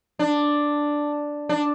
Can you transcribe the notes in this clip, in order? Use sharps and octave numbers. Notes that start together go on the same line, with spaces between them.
D4
D4